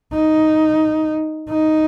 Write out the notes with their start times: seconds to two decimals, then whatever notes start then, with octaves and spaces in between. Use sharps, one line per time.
0.14 D#4
1.50 D#4